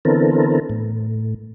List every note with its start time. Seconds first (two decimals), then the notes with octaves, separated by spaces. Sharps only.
0.05 D3 E3 B3 C4 A4 A#4
0.70 A2